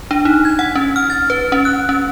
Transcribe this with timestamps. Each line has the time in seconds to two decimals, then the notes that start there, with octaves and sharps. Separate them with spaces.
0.11 D4
0.25 D#4
0.45 G#6
0.59 F#5
0.75 C#4
0.96 F6
1.10 A6
1.30 B4
1.52 C#4
1.65 F#6
1.89 C#4